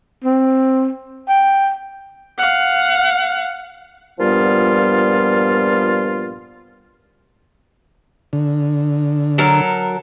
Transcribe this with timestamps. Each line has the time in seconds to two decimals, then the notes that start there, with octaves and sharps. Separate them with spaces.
0.24 C4
1.29 G5
2.38 F5 F#5
4.19 G2 A#2 F3 G3 B3 F4
8.33 D3
9.38 F#3 A4 A#4